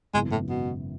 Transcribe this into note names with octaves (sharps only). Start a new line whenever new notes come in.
G#1 F#2 C#3 E3 G#3 B3
A2
B2